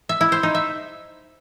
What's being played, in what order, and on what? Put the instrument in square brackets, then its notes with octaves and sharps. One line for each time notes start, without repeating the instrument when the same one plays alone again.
[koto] E5
E4
C5
D#4
E5